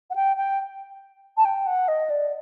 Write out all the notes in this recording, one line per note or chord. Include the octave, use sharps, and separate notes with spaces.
F#5
G5
G5
A5
G5
F#5
D#5
D5